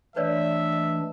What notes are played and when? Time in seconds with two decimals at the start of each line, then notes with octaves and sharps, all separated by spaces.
0.16 E3 A3 D4 B4 C#5 D5 E5
0.72 D#5